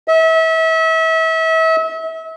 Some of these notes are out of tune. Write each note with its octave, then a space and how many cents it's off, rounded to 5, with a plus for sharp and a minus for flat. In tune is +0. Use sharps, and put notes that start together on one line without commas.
E5 -35